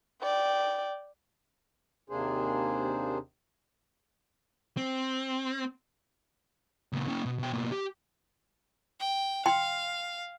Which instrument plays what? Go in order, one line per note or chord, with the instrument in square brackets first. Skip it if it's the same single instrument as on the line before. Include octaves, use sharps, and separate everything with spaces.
[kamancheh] D5 G5
[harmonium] D#2 C3 A#3 D4 G#4 C5
[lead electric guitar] C4
C#2 A#2
A#3 C#4
B2
B2 G5
B2 A#3
G4
[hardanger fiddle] G5
[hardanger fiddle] F5 [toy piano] G5 C6